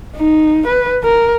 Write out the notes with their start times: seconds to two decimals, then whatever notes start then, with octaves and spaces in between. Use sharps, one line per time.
0.17 D#4
0.67 B4
1.04 A#4